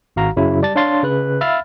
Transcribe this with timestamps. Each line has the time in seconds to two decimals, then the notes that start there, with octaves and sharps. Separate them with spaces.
0.16 G#1 F#4 F5 A#5
0.36 F#2 C#3 F#3 E4
0.62 G3 D5 A5 A6
0.76 D4 C#5 F5 C6 A6
1.03 C#3 B4 F#6
1.41 E5 F5 B5 E6 F6 A6